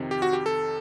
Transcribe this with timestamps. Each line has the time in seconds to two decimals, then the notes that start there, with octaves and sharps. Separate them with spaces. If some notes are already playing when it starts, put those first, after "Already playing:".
Already playing: F2 C3 D#3
0.11 G4
0.22 F#4
0.33 G4
0.46 A4